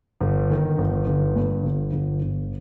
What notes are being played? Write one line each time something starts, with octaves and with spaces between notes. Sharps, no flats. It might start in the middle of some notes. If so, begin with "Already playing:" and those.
G1
D#3
G1
G1
G2
G1
G1
G1